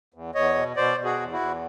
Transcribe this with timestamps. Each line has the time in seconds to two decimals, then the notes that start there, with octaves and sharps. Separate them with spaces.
0.14 E2
0.35 E2 C#5 D#5
0.55 B2
0.76 B2 C5 D5
0.98 B2
1.04 F#4 G#4
1.19 E2
1.33 E4 F#4
1.40 E2